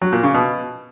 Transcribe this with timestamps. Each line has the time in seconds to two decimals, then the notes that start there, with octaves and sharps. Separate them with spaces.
0.02 F#3
0.12 A#2
0.23 C#3
0.34 B2